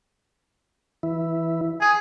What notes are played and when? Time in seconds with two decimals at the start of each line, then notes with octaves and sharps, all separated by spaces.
1.03 E3 E4
1.81 G#4